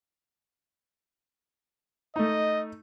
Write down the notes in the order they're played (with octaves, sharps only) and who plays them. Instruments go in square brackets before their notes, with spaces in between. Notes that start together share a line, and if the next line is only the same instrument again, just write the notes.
[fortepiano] A3 D#4 [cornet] D#5